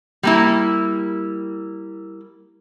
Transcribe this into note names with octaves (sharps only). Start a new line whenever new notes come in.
G3 A#3 E4